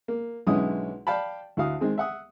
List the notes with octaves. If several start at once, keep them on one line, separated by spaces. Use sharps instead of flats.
A#3
B1 D3 G#3 C#4 E4 D#6
D5 F5 G5 A5 B5
D2 E4 F#4 F5 D#6
D#3 G#3 C4 G#4
E5 F#5 D#6